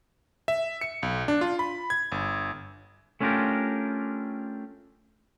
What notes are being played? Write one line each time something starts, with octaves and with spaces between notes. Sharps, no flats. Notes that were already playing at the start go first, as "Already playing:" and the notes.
E5
C#7
B1
D4
F4
B5
G#6
G1
A3 C#4 D4 F4 G4 A#4